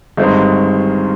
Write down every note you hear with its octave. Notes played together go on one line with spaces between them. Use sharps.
G1 G2 D#3 G#3 C4